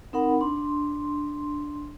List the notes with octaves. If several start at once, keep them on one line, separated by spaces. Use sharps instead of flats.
C4 D#4 A#4 F#5 B5
D4 C6